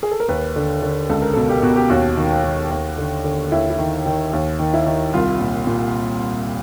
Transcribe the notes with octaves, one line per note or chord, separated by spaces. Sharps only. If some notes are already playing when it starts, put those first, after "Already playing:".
G#4
A4
A#4
D#2 B4
D3
D3
C#2 A4
A#4
B2 A4
G4
B2 F#4
G4
D#2 F#4
D#3
D#3
D#2
D3
D3
D#2 E4
E4
D#3
D#3
D#2
D#3
E4
D#3
C2 F4
A#2
A#2